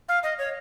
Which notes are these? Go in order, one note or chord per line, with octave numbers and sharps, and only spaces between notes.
F5
D#5
C#5